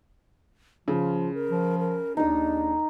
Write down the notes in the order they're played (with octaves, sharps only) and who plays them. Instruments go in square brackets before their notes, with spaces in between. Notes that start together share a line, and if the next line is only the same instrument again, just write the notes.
[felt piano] C#3 [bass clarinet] F3 [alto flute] F4
[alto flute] A#4
[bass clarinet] F3
[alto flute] A#4
[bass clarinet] D#2 [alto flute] D4 [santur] D#4 D#6